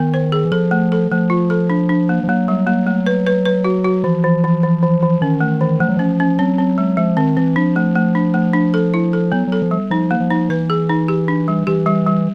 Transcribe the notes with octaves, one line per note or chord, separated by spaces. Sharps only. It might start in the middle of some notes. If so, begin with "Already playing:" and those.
Already playing: D#3 B3
C5
G#4
E3
F3 A4
A3
A4
F3 A3
F4
A4
D4
D4
A#3
F3
F#3 A#3
G3
A#3
A3
B4
B4
B4
F#4
F#4
E3 F3
E3
E3
E3
E3
E3
D#3 C#4
A3
E3
F3 A3
F#3
F3 C#4
C#4
F#3 C4
C4
G#3
F3 G#3
D#3 C4
E3 C4
F3 D4
A3
A3
D4
A3
D4
A4
E4
A4
F#3 B3
F#3 A4
F3
G3
F3 D#4
A#3
F3
D#4
E3 B4
G#4
D#4
G4
D4
G3
E3 G4
G3
G3